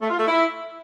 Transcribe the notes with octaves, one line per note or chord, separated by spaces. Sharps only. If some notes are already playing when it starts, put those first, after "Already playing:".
A3
F4
A3
E4